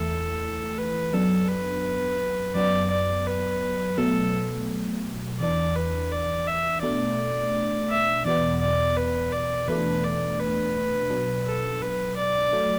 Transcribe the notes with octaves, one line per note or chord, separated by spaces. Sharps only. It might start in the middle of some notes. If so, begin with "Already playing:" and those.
Already playing: E2 E3 A3 E4 A4
B4
F#2 F#3 B3 D4 A4
B4
F#2 F#3 B3 D5
D5
B4
B2 F#3 A3 A4
E2 E3 D4 D5
B4
D5
E5
B2 A3 D4 D5
E5
E2 B2 B3 D5
D5
B4
D5
E2 B2 A3 D4 B4
D5
B4
B2 F#3 D4
A4
B4
D5
F#3 A3